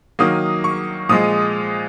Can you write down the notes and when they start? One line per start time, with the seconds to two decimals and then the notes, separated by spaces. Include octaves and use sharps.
0.19 D#3 F#3 A#3 D#6
0.64 C#6
1.09 A#2 F3 G#3 D#6